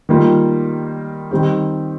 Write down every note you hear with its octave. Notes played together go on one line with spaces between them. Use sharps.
D#3 G3 A#3 F4
D#3 G3 C4 G4